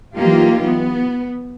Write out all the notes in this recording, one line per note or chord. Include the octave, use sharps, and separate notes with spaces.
E3 F#3 A#3 D#4 F4 G4
B3